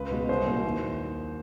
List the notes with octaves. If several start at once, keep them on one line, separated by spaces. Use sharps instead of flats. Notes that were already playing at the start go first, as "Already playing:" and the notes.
Already playing: C#2 B4
B2 G#3
C2 C5
A#2 F#3
D#2